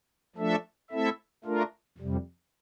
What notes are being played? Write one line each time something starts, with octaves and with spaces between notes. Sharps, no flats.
F3 A3 D4 A4 E5
A3 C4 E4 A4 E5
A3 D4 F4 A#4
F2 C3 G3